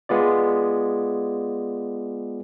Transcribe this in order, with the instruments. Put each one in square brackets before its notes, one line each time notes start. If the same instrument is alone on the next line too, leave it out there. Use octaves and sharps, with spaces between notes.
[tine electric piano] G#3 B3 F4 D5